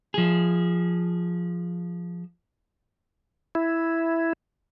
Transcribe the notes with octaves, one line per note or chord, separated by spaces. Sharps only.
F3 G#4
E4